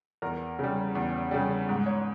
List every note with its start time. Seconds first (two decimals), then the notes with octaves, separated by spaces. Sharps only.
0.22 E2 A#4
0.59 C#3 G3
0.95 E2
1.31 C#3 G3
1.69 G#2
1.86 C#5